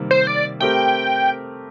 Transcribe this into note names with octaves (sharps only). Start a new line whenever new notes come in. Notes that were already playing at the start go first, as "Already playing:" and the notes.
Already playing: C3 D#3 G3 A#3
C5
D5
A3 C4 G4 A#4 G5